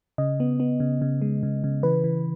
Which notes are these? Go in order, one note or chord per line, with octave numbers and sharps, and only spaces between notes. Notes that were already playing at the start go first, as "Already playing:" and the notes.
C#3 D#5
B3
B3
C#3
C#3
G#3
C#3
C#3
E3 B4
E3